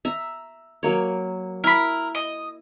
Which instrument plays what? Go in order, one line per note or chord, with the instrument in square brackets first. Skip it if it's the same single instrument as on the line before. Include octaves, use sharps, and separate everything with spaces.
[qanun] E5 A#5
F#3 A#3 C#5
[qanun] E4 [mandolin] A#4 B5
[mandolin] D#5